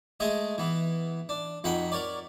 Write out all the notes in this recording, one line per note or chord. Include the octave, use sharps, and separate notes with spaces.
G#3 A3 G#4 D#5 G#5
E3 B3
D4
F2 D#4 F#4 F#5 G5 B5
A#4 C#5 D5